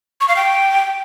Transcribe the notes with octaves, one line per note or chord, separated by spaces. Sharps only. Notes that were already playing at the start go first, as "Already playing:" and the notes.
C#6
F5
G5